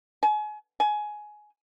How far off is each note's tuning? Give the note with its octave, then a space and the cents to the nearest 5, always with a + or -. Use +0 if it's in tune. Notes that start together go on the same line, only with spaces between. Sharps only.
G#5 +35
G#5 +15